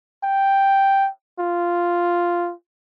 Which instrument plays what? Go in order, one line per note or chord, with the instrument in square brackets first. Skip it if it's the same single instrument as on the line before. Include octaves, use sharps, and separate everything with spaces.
[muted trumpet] G5
F4